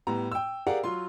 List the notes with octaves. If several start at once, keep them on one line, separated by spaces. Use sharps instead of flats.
A2 G3 B3 A#5
G5 E6
G4 G#4 A#4 D5 F5 F#5
F#3 F4 C6